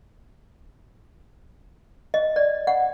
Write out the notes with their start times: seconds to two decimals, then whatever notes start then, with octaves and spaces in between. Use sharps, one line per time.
2.14 D#5
2.36 D5
2.67 F#5